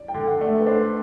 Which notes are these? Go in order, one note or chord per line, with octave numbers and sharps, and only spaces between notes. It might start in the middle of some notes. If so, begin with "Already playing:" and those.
Already playing: D5
G5
D3
F#5
A3 D5
E5
B4
D4 C5